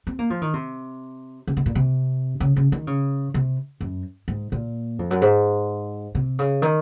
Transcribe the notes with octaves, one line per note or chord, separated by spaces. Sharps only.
C4
A#3
F3
D#3
C3
C#3
C3
A#2
C3
C#3
C#3
D#3
C#3
C3
F#2
G#2
A#2
F2
F#2
G#2
C3
C#3
D#3